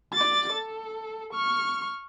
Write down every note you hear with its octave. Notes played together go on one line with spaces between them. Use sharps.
D5 A6
A4
C#6 F6